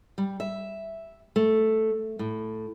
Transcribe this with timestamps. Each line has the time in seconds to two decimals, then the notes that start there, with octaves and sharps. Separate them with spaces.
0.18 G3
0.40 E5
1.36 A3
2.19 A2